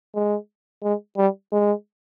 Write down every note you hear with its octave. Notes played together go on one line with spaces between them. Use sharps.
G#3
G#3
G3
G#3